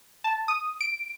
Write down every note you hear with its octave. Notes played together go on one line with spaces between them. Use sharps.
A5
D#6
D7